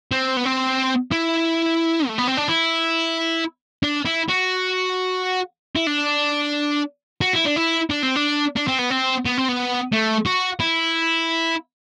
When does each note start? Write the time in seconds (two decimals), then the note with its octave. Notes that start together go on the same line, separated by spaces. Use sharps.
0.11 C4
0.37 B3
0.45 C4
1.12 E4
2.07 A3
2.18 B3
2.27 C4
2.37 D4
2.48 E4
3.83 D4
4.05 E4
4.29 F#4
5.76 E4
5.87 D4
7.21 F#4
7.33 E4
7.45 D4
7.57 E4
7.90 D4
8.03 C4
8.16 D4
8.57 D4
8.68 C4
8.79 B3
8.90 C4
9.25 B3
9.37 C4
9.48 B3
9.92 A3
10.26 F#4
10.60 E4